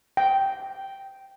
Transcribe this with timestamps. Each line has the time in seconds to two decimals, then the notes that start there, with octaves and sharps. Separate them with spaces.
0.17 G5